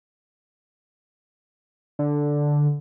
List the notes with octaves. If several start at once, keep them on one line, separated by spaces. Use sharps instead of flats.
D3